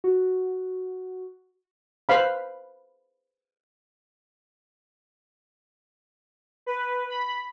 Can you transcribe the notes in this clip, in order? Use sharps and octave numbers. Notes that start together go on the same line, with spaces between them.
F#4
B4 C5 F5 B5
B4
B5